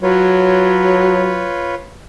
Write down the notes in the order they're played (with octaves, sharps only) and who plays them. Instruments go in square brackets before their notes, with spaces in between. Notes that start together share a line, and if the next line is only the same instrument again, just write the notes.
[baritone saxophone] F#3 [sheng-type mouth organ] F4 B4 C#5